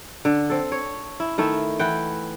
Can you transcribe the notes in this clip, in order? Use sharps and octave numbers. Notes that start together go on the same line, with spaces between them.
D3
C4 A4
C#5
E4
D#3 A3 E4
E3 B4 F#5 G5